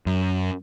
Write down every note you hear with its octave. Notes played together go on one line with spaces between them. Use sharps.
F#2